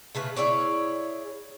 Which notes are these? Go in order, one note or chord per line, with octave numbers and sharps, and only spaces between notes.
C#3 A3 B4
E4 G#4 C#5 D5